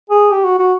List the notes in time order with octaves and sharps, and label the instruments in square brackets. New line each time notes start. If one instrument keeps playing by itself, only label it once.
[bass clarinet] G#4
G4
F#4
F#4